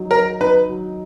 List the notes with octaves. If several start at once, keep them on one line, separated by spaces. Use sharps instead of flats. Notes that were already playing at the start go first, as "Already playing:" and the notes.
Already playing: F#3 D#4
F#3 A#4
D#4 B4
F#3